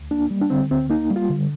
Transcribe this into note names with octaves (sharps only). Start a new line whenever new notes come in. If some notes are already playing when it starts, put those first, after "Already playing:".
Already playing: D2
A#3 D4
G3
D4
D3 C4
D2 C4
A#3 D#4
G3
F4
D3